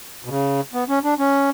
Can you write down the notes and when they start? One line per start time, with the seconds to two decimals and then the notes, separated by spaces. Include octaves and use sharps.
0.24 B2
0.29 C#3
0.74 B3
0.89 C#4
1.04 D4
1.19 C#4